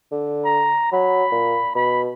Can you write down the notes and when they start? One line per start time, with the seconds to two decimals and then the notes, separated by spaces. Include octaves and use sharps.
0.11 D3
0.45 A#5
0.92 F#3 B5
1.32 A#2
1.75 B2 B5